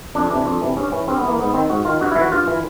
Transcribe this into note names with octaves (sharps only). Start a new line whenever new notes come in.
F2 D4
C3 E3 D4
F2
C3 E3
G2 C#4
E3 C#4
G2 C4
B3
E3 A#3
G#2 B3
D#3 C4
G#2 F#4
D#3 F4
G2 F#4
E3 E4
F#4
G2 F4
E3